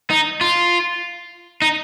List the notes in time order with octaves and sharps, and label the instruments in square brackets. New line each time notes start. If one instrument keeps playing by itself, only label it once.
[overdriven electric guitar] D#4
F4
D#4